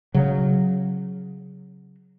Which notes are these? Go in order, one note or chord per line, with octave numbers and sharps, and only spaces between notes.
C#3 F#3